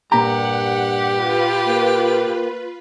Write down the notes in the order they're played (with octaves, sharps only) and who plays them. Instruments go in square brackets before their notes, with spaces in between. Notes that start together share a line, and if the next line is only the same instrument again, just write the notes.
[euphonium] G2 [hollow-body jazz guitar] A#2 A#5 [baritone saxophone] G4 [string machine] F#5
[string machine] F4 B4
[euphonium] A#3